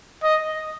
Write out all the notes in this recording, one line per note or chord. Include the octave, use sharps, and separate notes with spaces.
D#5